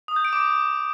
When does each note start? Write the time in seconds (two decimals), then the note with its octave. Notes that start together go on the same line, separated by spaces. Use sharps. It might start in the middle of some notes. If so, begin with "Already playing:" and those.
0.08 D#6
0.16 G6
0.25 D7
0.33 D6